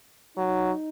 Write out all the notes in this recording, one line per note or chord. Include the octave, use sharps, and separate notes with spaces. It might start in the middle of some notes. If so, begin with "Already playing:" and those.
F#3 D#4